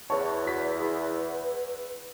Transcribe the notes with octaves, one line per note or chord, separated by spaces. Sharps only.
E2 C#5 A5 C#6
F#4 B6
E4 G#4 B4